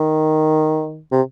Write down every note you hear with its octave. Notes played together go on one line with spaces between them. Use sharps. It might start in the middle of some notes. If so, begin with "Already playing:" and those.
Already playing: D#3
C3